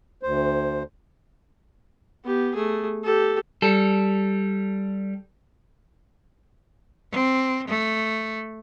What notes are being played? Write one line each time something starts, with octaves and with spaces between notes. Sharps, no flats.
D2 C5
B3 G4
A3 G#4
G4 A4
G3 A4
C4
A3